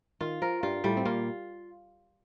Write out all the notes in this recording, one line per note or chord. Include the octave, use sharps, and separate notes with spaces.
D#3 F4
F3 A#4
G2 G3 F4
A2 G3 A3
C4
A#2 A#3 F4